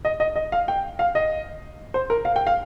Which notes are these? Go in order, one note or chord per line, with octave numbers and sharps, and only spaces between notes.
D#5
D#5
D#5
F5
G5
F5
D#5
C5
A#4
F5
G5
F5